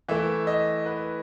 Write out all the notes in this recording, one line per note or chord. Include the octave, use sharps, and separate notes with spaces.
E3 A3 E4 E5
D#5
B4